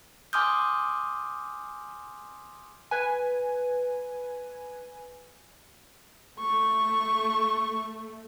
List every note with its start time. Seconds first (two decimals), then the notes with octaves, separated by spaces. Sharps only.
0.33 G#5 C6 D6 D#6 F6 G6
2.91 B4 G#5
6.40 A3 C#6